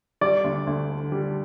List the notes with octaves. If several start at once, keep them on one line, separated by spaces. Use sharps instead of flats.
G3 D5 D6
D2
D2
D3
G3